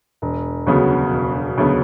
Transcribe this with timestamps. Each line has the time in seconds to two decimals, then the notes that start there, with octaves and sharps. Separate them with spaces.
0.22 E1
0.67 D2 C#3 F#3 B3
1.12 E1
1.58 D2 C#3 F#3 B3